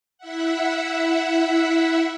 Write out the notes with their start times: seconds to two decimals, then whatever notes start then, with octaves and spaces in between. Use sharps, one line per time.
0.18 E4 E5 F#5